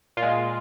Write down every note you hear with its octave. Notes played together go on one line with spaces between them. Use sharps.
A#2 F4
G#3